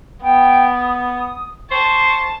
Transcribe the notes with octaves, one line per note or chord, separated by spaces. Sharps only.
B3 G5
D#6
C5 A5 C#6